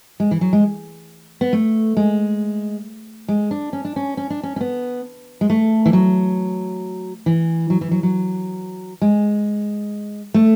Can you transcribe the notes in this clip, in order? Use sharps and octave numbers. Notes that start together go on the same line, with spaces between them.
G#3
E3
F#3
G#3
B3
A3
G#3
G#3
D4
C#4
D4
C#4
C#4
D4
C#4
C#4
B3
G#3
A3
E3
F#3
E3
F#3
E3
F#3
F#3
G#3
A3